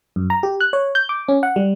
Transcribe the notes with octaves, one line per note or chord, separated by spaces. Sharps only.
F#2
A#5
G4
F#6
C#5
G6
D6
C#4
F#5
G3